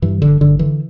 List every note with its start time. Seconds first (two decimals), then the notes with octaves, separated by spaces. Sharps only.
0.02 G2 E3
0.22 G1 D3
0.41 G1 D3
0.59 D3 E3